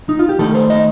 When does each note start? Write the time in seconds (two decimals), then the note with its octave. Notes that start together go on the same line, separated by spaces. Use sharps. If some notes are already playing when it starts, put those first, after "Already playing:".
0.09 D#4
0.19 F4
0.29 G4
0.38 D#3 A3 D#4 A4
0.55 C5
0.70 D#5